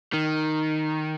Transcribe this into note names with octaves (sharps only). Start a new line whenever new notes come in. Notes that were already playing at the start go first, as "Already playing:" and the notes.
D#3